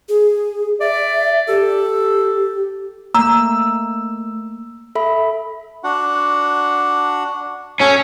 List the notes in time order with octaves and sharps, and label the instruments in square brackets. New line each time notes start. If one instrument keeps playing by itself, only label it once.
[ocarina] G#4
[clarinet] D5 [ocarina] E5
[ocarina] G4 [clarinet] A4
[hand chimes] A3 A#3 [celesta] A#5 [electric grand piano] E6
[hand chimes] A4 E5 B5
[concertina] D4 F#4 F#5
[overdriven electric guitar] C#4 [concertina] F#4 A4 C#5